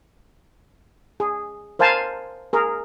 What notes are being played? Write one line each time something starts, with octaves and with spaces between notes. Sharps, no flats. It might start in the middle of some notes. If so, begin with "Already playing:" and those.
G#4
A#4 C5 F5 G#5 A5
G#4 A#4